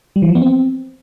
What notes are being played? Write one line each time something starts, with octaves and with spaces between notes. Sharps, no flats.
G3
E3
F3
B3
C4